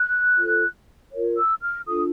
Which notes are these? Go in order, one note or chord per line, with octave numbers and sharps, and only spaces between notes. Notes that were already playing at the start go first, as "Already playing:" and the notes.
Already playing: F#6
F4 A4 C5
F4 A#4 C#5
E6
F6
D4 F4 A4 D#6